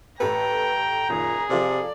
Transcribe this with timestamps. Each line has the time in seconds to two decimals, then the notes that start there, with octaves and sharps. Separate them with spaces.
0.20 A1 G4 A4 B4 G5 A#5
1.10 F#1 A#2 D#3 G#4
1.50 C3 F3 F4 A4 D5